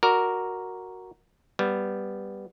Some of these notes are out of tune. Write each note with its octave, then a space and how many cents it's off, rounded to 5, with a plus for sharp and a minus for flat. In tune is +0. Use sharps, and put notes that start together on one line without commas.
F#4 +0 A#4 +0 D5 +0
G3 +0 B3 +0